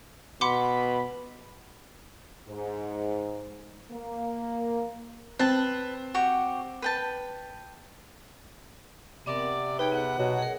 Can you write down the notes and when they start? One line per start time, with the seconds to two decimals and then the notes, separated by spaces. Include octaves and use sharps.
0.41 B2 F#5 B5 C6 D6
2.48 G#2
3.91 A#3
5.39 C4 B4 A5
6.14 F#4 G4 C#6
6.82 B4 G5 A5
9.26 C3 B3 C4 A#4 D5
9.39 F#5
9.79 D#4 G#4 B4 C#5 G5
9.92 B3 F#5
10.19 B2 F#3
10.39 G#4 A#4